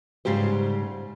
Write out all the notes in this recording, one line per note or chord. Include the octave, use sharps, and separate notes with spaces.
G#2 C#3 G3 G4 C5